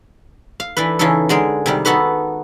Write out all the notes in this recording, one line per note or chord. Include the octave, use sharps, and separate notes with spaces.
F5
E3 D4 A4 B4
C#3 E3 C#4 D#4 A4
D3 G#3 G#4 A#4
C3 D#3 G3
B3 D#4 F#4 A4 B4 A5